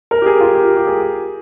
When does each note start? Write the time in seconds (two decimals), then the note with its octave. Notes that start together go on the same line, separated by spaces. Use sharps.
0.11 A#4
0.22 G4
0.26 G#4
0.41 F4
0.54 G4
0.77 G4
0.87 G#4